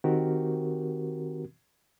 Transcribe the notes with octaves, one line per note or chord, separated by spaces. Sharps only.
D#3 C4 F#4 G4 A#4